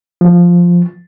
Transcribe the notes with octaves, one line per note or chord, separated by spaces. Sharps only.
F3